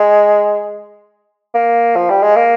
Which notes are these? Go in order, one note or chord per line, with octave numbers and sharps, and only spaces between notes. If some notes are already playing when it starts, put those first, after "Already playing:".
Already playing: G#3
A#3
F3
G3
G#3
A#3